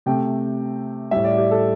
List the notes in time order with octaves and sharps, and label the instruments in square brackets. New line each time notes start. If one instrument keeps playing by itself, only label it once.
[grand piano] C3 A3 G5
A2 G3 E5
D5
G4
A4